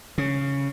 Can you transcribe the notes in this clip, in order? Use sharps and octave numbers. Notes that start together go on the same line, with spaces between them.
C#3